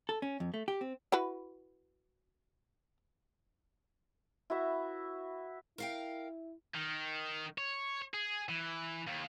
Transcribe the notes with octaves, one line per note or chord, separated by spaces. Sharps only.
A4
C#4
F2
A3
G4
C4
E4 F#4 B4
E4 F#4 B4 E5
E4 A#4 F5 G5
D#3
C#5
G#4
E3
D#2